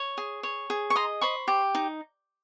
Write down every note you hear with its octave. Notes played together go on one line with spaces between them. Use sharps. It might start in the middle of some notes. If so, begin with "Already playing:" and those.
Already playing: C#5
G#4
C#5
G#4
C#6
D#5 A#5 C6
C5 B5 C#6
G4
D#4